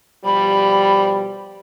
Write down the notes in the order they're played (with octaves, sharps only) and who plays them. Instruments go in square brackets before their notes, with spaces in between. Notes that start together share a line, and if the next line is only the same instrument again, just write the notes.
[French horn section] B2 F3 G3 [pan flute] B5